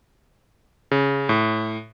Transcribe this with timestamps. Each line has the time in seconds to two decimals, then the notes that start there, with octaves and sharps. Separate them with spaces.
0.91 C#3
1.29 A2